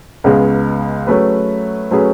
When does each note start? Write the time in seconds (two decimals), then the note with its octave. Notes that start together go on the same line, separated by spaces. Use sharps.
0.24 C#2 C#3 G#3 B3
1.07 F#3 A3 C#4 G#4 B4
1.91 F#3 A3 C#4 G#4 B4